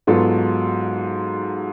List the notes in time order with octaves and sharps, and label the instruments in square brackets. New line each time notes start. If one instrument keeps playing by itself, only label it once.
[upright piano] G#2 F#3 B3 F4 A4